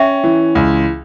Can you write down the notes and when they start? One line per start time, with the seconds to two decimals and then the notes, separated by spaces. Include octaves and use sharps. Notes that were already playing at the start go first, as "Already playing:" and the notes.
Already playing: C#4 E5 G5
0.24 E3
0.55 C#2